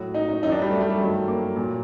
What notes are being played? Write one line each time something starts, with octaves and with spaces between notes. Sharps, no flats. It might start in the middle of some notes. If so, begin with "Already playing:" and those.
Already playing: A2 F#3 F#4
D#4
D#4
F#2 D#3 F#3 D#4
D4
G3
A3
G3
A3
G2 D#3 F#3
A#3
A#2 F#3